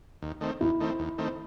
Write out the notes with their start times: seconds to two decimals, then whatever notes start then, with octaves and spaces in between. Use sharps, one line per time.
0.22 D#2
0.41 D#3 A3 C4
0.61 D#2 E4
0.80 D#3 A3 C4
0.99 D#2
1.18 D#3 A3 C4